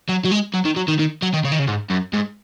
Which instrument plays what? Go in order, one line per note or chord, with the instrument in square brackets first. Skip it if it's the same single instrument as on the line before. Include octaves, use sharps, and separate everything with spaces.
[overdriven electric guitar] F#3
F#3
G#3
F#3
D#3
F#3
D#3
D#3
F#3
D#3
C#3
D#3
C#3
G#2
F#2
G#2